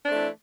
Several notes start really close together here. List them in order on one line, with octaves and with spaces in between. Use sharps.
D4 C4 A3 E3